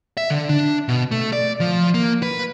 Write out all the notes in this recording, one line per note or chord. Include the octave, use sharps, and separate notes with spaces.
E5
D3
D4
B2
A3
D5
F3
A#3
B4